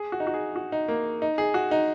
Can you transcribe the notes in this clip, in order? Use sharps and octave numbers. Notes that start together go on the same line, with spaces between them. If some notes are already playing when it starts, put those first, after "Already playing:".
Already playing: G#4
F#4
D#4
F#4
G#4
F#4
D#4
A#3
D#4
G#4
F#4
D#4